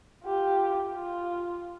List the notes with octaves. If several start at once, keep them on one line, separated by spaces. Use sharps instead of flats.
F4 G4
F4